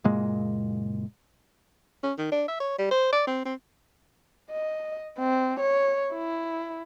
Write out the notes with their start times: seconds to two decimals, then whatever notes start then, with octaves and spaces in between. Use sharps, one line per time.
0.04 F#1 A#2 G#3 A#3
2.03 C#4
2.18 D#3
2.32 D4
2.48 E5
2.60 C#5
2.78 G3
2.91 C5
3.12 D5
3.27 C4
3.45 C4
4.51 D#5
5.19 C4
5.60 C#5
6.14 E4